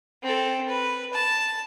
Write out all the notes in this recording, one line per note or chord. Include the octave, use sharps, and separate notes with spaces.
C4 A4
B4
A5